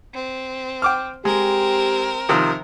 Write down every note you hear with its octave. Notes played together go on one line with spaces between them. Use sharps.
C4
G5 D6 F6
G#3 C4 G4 A#4
C3 D#3 F3